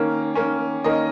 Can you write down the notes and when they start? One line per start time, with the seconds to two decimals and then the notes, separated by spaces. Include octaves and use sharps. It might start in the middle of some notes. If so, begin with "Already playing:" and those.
Already playing: D#3 A#3 C#4
0.35 D#3 A#3 C#4
0.84 D#3 A#3 C#4 D#5